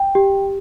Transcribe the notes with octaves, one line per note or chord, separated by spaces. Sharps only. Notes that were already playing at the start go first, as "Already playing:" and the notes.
Already playing: G5
G4